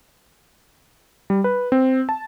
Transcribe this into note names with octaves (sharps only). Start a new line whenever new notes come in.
G3
B4
C4
A5